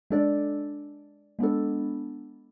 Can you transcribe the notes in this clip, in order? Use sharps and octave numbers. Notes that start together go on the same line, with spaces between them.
G#3 D4 A4 D5
G#3 B3 D4 A4